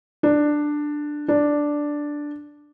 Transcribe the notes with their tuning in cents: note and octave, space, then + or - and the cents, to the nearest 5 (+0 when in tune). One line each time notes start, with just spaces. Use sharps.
D4 +10
D4 +0